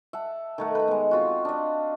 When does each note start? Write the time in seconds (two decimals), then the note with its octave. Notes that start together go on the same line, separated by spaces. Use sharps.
0.13 E5 F#5 A5
0.58 D#3 A3 F#5
0.75 B4 A#5
0.88 G#3 B3
1.11 C4 F4 F#4
1.45 D4 D#5